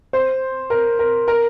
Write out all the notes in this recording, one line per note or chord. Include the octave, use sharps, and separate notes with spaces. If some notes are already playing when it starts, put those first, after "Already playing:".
C5
A#4
A#4
A#4